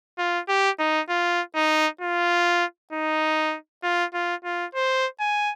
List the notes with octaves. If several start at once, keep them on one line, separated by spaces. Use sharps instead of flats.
F4
G4
D#4
F4
D#4
F4
D#4
F4
F4
F4
C5
G#5